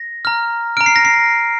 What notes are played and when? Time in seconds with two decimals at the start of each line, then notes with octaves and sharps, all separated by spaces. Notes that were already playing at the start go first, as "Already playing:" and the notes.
Already playing: A#6
0.25 A#5 F6
0.77 A#5 F6 D7
0.86 C7
0.96 A#6
1.05 C7